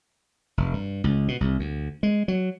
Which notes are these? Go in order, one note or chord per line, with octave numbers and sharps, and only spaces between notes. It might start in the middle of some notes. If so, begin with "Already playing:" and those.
F1
G2
C#2
B2
C2
D2
G#3
F#3